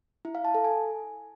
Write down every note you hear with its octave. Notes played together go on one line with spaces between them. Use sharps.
E4
F5
A5
A4
G#5